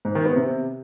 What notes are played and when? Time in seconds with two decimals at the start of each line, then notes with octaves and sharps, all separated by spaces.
0.05 G#2
0.15 D#3
0.26 B3
0.36 C3